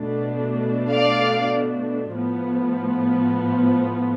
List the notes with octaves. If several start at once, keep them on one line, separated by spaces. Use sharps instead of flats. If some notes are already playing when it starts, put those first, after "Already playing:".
Already playing: B2 A3 D4
D5 F5
A2 F3 B3